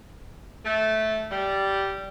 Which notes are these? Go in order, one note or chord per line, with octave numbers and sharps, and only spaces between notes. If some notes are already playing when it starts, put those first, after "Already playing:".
A3
G3